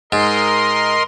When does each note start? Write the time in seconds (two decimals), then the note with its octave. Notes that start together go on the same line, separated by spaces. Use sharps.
0.12 G#2 A#4 D#5 C6